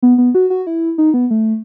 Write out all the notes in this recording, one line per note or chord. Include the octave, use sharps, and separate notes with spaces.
B3
B3
F#4
F#4
E4
D#4
B3
A3